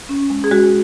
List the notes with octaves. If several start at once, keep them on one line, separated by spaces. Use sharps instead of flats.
C#4
G#3
G#4
G#3 F#4